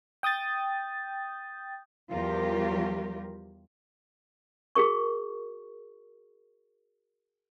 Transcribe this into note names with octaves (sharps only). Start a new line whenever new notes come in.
G5 D#6 G6 A6
E2 F3 G3 F4 G4 A#4
F#4 G#4 A#4 C#6